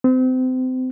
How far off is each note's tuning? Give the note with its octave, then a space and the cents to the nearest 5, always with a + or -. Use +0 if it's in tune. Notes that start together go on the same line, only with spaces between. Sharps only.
C4 -30